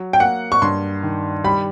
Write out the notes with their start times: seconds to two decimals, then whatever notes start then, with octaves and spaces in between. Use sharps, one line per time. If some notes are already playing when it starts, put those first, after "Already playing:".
Already playing: F#3
0.13 G5
0.20 A#3 F#5
0.52 C#6
0.62 G2 C6
1.03 D#3
1.44 G3 B5